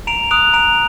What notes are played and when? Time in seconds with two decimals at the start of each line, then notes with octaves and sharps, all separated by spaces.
0.07 A#5 D7 F7
0.31 D#6 F#6 D7 F7
0.54 A#5 D7 F7